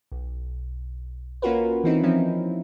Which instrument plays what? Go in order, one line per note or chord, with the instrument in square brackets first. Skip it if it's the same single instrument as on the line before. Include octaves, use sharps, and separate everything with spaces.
[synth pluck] B1
A#3 C#4 F4 F#4 A#4 B4
E3 C4 D#4 E4
F3 C4 C#4 D#4 E4